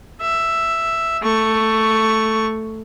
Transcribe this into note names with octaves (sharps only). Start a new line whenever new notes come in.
E5
A3 C#6